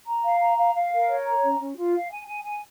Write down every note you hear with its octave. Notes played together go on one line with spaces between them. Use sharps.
A#5
F5
A#5
F5
F5
A#4
C#5
A#5
C#4
C#4
F4
F5
G#5
G#5
G#5